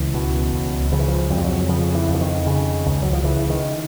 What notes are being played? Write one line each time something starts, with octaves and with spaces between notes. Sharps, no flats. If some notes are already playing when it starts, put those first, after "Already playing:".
Already playing: C#2 E3
B2
C#2
C#3 F3
E3
F3
F2 F#3
G3
F#3
C#3 F3
E3
F2
D3
D#3
C#3
C#2
F#3
F3
C#3 E3
D#3